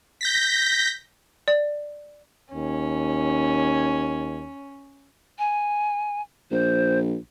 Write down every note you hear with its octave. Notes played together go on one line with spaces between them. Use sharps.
G6 A#6 B6
D5
D#2 C#4
G#5
A#1 C5